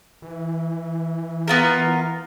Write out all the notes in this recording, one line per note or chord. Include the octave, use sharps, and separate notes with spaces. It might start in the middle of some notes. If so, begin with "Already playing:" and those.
E3
B3 F4 A#4